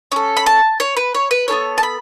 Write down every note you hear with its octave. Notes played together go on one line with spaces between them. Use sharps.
C#4 A4
B5
A5
C#5
B4
C#5
B4
B3 E4 A4 C#5
A5
B5